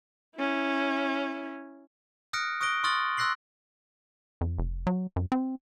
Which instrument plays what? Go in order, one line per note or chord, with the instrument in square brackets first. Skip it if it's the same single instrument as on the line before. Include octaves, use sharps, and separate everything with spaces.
[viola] C#4 E4
[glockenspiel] D#6 F6 F#6 A#6 C#7 D7
C#6 D#6 F#6 A#6 D7 G7
C6 C#6 D#6 F6 A6 F#7
C6 E6 F#6 A#6 C7 F#7
[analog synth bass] F2
F1
F#3
F#2
C4